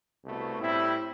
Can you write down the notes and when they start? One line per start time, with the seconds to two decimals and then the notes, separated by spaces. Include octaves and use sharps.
0.24 C2 B2 A3
0.59 A2 G3 C4 E4